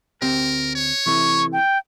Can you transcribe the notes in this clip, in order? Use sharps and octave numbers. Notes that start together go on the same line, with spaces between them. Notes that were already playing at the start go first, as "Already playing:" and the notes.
D2 C4 G4 A#4
C#5
C3 E3 A3 C#6
G5